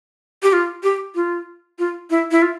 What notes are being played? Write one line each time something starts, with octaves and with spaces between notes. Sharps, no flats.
G4
F4
G4
F4
F4
E4
E4
F4